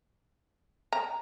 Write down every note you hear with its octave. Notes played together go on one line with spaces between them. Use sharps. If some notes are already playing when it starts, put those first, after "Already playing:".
A#5